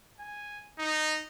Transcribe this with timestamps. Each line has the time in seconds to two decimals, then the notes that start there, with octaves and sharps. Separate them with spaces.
0.19 G#5
0.79 D#4